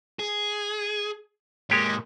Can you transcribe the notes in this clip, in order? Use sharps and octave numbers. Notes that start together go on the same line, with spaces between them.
G#4
G#2 G#3 A#3 G4 C#5